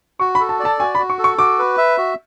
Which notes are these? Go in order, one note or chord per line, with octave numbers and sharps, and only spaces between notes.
F#4 C#6
B5
A4
A5
D5
A5
F#4 G#5
B5
F#4
C#6
A4
C#6
F#4 D6
B4
E5
F#4